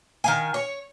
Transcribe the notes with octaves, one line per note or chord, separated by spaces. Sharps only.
D#3 F5 G#5
C#5